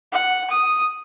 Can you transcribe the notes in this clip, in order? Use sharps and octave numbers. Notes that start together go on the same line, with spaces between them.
F#5
D#6